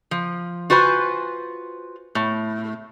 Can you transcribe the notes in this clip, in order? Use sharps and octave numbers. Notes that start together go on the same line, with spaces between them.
F3
F4 F#4 B4 C5 G#5
A2